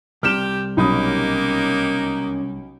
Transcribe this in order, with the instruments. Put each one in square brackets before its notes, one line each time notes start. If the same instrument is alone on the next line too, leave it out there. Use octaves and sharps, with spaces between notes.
[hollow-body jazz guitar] C2 C3 G3 [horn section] G4 [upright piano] F6 E7
[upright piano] B1 B5 D#6 [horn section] A#3 D#4 G4 [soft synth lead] C#4